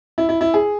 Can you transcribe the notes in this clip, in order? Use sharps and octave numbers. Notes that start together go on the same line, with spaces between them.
E4
E4
E4
G#4